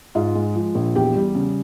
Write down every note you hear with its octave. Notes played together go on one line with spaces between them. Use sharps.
G#2 F4 F5
G#3
F3
A#1
E2 G4 G5
G3
C#3